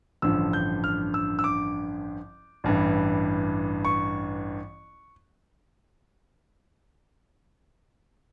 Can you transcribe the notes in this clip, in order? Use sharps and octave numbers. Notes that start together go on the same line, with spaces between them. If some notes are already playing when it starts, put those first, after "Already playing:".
A1 G2 D3 F3 E6
G6
F6
E6
E6
D6
A1 G2 E3
C#6